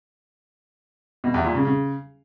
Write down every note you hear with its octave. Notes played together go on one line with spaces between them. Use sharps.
B2
E2
A#2
C#3
C#3